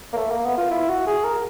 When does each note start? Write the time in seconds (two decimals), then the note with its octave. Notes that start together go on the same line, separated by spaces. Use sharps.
0.13 A#3
0.17 A3
0.31 A#3
0.45 B3
0.58 F4
0.71 E4
0.90 F#4
1.07 G#4
1.25 A#4